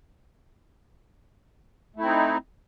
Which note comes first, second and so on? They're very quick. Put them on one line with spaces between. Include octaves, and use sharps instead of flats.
A3 E4 C4 D#4